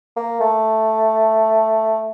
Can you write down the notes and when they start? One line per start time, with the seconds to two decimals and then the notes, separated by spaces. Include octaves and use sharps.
0.16 A#3
0.40 A3